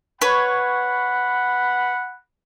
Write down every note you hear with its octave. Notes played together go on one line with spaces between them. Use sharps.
B4 C#5 F#5 B5